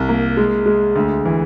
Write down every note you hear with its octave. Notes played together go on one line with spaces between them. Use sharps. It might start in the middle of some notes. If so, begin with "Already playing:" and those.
Already playing: C2
A#3
G#3
G#3
D2
E3